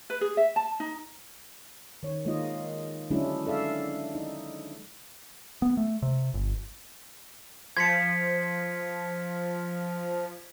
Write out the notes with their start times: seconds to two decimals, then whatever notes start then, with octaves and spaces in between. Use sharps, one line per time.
0.10 B4
0.21 G#4
0.37 E5
0.56 A5
0.80 D#4
2.03 D#3 C#5
2.25 D#3 G#3 A#3 D#4 F4 D#5
3.10 D3 F#3 G#3 C#4 D4 E4
3.46 A4 D5 E5 F5
4.15 D#4
5.62 B3
5.77 A3
6.02 C3
6.34 G1
7.77 F3 G#6 B6 C#7